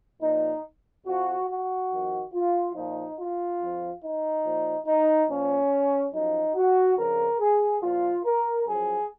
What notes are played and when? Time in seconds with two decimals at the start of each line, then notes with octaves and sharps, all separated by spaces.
0.20 A#2 F3 D#4
1.05 F2 F3 F#4
1.47 F#4
1.89 F2 D#3
2.32 F4
2.74 A#2 F3 D#4
3.17 F4
3.59 F2 F3
4.01 D#4
4.43 A#2 F3
4.85 D#4
5.28 A#2 F3 C#4
6.12 F#2 F3 D#4
6.54 F#4
6.96 F2 C#3 F3 A#4
7.38 G#4
7.80 A#2 F3 F4
8.23 A#4
8.65 F#2 F3 G#4